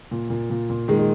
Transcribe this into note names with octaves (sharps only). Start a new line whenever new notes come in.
A#2
A#2
A#2
A#2
D#3 G#3
G#3